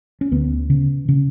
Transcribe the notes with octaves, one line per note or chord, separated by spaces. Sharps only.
C#4
D2 B3
C#3
C#3